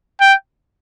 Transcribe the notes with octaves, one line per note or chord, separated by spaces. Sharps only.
G5